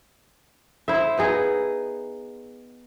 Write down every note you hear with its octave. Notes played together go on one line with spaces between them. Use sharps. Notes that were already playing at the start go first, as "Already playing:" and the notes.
E4 C5 E5
B3 D#4 G#4